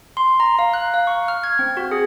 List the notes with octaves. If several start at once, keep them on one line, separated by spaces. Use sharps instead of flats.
C6
A#5
F5
F#6
F5
C#6
F6
G#6
C4
F#4
G#4